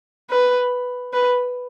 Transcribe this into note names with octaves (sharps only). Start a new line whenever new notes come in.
B4
B4